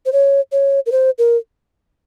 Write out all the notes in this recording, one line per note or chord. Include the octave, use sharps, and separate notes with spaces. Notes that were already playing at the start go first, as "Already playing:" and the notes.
C5
C#5
C#5
A#4
C5
A#4